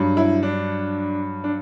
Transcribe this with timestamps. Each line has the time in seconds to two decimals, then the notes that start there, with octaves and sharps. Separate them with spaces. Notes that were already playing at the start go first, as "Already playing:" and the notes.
Already playing: G2 F#3
0.17 E4
0.43 D4
1.44 D4